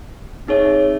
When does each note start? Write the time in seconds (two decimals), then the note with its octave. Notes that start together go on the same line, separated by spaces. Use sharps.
0.47 C4 D#4 G#4 C#5 E5